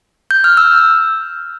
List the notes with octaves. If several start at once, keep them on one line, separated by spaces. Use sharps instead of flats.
G6
F6
E6